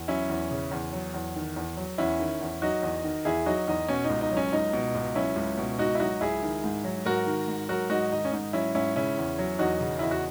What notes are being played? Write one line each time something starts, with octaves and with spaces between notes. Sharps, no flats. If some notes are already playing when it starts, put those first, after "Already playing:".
Already playing: E2
F#3 C#4 E4
E2
C#3
E2
F#3
E2
D#3
E2
F#3
E2 C#4 E4
D#3
E2
F#3 D#4 F#4
E2
D#3
E2 E4 G#4
F#3 D#4 F#4
E2 D#4
B2 C#4
D#4
C#2
D#4
F#3
C#4
C#2 D#4
B2
C#2
F#3 C#4 E4
C#2
B2
C#2 D#4 F#4
E4
F#3 D#4 F#4
C#2 E4 G#4
D#3
G#2
F#3
G#2 F#4 A#4
D#3
G#2
F#3 F#4 A#4
G#2 D#4 F#4
D#3 D#4
C#4
G#2 D#4
F#3 C#4 E4
G#2 C#4 E4
C#3 C#4 E4
E2
F#3
E2 D#4 F#4
C#3
E2 E4
F#4